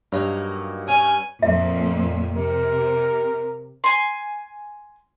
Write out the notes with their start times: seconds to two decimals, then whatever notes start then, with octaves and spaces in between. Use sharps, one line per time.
0.12 G2 F#3 A#3 D#4
0.88 C#4 G#5
1.43 F2 A#2 E5
2.36 C3 A#4
3.84 G#5 C6